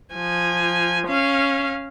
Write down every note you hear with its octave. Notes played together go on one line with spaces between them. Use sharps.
F3 G#5
C#4 F5